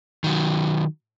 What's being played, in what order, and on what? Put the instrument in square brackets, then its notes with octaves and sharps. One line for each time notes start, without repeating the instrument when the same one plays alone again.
[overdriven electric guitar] D#3 F#3